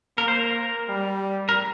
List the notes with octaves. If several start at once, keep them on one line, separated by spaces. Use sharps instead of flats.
A#3 A#4
C5
A#4
G3
A#4